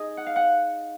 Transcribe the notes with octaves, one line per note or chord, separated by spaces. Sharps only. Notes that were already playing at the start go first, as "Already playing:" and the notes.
Already playing: D#4 G#4 D#5
F#5
F5
F#5